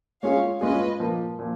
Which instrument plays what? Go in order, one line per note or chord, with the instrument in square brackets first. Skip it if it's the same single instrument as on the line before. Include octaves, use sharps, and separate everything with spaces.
[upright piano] G#3 C#4 F4 G#4 [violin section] C#5 F5
[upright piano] G#3 C#4 F4 G#4 [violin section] B4 D#5
[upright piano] A#2 F3 A#3
A#2 F3